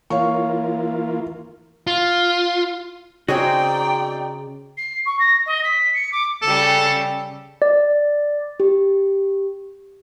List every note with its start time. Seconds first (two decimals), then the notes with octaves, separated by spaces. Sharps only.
0.10 E3 A#3 F4 C#5 F5 C#6
1.87 F4
3.28 C#3 C4 D#4 F#4 G#4 C#5 D5 G5
4.77 C7
5.06 C#6
5.19 A#6
5.46 D#5
5.64 B6
5.94 C#7
6.12 D6
6.42 C#3 G3 A4
7.62 D5
8.60 G4